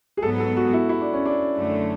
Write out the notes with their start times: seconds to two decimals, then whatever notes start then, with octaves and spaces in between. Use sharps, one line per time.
0.17 G#4
0.22 G#2 F#3 B3 A4
0.40 A4
0.57 F#4
0.73 E4
0.89 E4
1.01 D4
1.13 C#4
1.26 D4
1.56 F#2 D3 A3